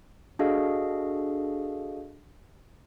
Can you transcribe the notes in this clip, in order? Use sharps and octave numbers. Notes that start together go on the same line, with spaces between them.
D4 F#4 G#4 A4 D#5 F5